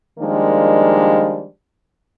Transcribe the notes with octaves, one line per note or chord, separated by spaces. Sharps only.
D#3 F3 G3 G#3 A#3 D4